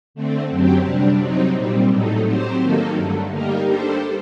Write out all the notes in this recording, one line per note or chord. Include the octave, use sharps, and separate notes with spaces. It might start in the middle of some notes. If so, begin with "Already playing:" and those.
D3 A3 C4
F#2 F#3 C4 G4
C3 G3 D4
C3 F#3 C4 D#4
A#2 G3 C4
A2 F#3 A3 D#4
F#3 C4 G4 C5
D#3 F#3 A#3 D#4 A4
G2 D3 A3
G3 A#3 D#4 G4 A#4
G3 D4 A4 C5